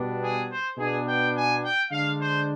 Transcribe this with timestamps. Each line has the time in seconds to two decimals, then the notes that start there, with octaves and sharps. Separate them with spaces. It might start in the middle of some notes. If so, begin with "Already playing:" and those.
Already playing: B2 G3 B3 D4
0.22 G#4
0.50 C5
0.78 B2 B3 D4 G#4
1.06 G5
1.34 G#5
1.62 G5
1.91 D3 G#3 D4 F5
2.18 C5